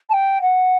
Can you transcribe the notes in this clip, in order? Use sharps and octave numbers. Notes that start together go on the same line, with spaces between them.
A5
G5
F#5